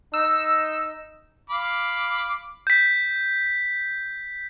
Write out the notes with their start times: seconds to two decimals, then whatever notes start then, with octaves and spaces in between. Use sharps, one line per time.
0.14 D#4 E6
1.50 F5 B5 D6
2.67 G6 B6